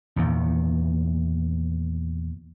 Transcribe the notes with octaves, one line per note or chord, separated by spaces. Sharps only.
E2 A#2 D#3